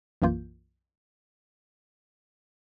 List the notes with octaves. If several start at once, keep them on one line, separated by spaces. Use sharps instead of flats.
B1 F#2 E3 A#3 F4 G6